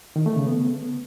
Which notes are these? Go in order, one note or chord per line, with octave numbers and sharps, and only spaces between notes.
D#3
A3
C#3
B3